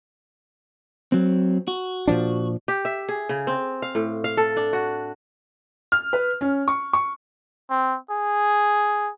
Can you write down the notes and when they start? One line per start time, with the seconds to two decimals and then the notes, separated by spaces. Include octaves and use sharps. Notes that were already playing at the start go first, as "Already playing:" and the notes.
1.12 F#3 C4
1.68 F#4
2.08 A#2 F3 D4
2.68 G4
2.85 E5
3.09 G#4
3.29 C#3
3.47 C4
3.82 F5
3.95 A2
4.24 F5
4.37 A4
4.57 D4
4.73 F#4
5.92 F6
6.13 B4
6.41 C#4
6.68 C#6
6.93 C#6
7.70 C4
8.11 G#4